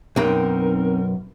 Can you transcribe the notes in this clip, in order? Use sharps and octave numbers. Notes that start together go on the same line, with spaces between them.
B1 F#2 C4 D#4 A#4 G5